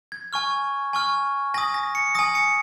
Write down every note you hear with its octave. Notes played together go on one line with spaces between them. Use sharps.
G#6
G#5 C#6 F6
G#5 C#6 F6
G#5 D#6 A#6
A#6
C#7
G#5 D#6 A#6
C#7